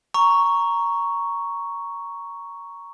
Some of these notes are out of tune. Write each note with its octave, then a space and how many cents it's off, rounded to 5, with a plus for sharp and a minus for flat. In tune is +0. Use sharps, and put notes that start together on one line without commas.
A#5 +0 C#6 +5